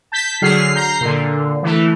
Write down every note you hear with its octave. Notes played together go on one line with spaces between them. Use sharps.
A5 G6 B6
D3 F#3 G#4 F6 C7
A#5 G6 C7
A#2 D3
E3 A3